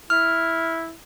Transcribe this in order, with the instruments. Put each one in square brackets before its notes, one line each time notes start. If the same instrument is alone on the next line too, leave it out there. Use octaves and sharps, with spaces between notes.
[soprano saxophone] E4 [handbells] F6